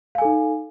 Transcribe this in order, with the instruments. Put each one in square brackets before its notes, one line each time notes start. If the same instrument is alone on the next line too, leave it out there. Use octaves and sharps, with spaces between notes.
[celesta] F5
G#5
A4
D#4